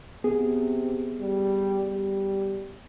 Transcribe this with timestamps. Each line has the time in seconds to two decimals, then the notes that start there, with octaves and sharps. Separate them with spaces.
0.24 C3 B3 G#4
1.19 G3
1.89 G3